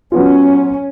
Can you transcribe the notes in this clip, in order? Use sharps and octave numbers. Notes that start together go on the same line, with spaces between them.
F#3 B3 C#4 F4